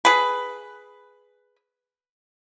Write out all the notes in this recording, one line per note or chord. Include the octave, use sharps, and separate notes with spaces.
G#4 B4